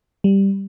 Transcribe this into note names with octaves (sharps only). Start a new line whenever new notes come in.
G3